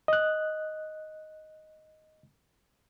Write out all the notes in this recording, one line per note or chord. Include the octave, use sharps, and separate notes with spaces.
D#5 F#6